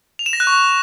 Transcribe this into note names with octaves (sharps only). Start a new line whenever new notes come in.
F7
E7
A#6
F#6
C#6